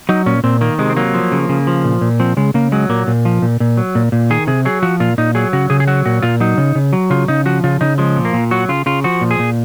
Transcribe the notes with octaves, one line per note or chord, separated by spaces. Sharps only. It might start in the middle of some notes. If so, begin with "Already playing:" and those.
F#3 D#4
A#2 C#4
A#2 C4
D#3 A#3
C3 G#3
C4
F#3 A#3
F3
C#3
C#3
F3
A#2
A#2
F3 C4
C#3 G#3
C#3 A#3
F#3 G#3
A#2 A#3
A#2
F3
A#2
A#2
F#3
A#2
A#2
D#3 G#4
C3 G#4
F#3 G#4
F3 F#4
A#2 F4
A#2 D#4
F#3 G#4
C#3 F#4
C#3 G#4
G#4
F#3 F#4
A#2 F#4
A#2 F4
F#3 D#4
C#3
C#3
F#3
C#3 F4
C#3 D#4
F3 F#4
C#3 F4
C#3 D#4
F3 G#3
A#2
A#3
A#2
F#3 F#4
C#3 F4
C#3 F4
F3 F#4
A#2
G#4
A#2